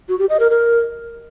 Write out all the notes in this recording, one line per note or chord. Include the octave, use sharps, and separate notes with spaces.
F#4
G4
D#5
A#4
A#4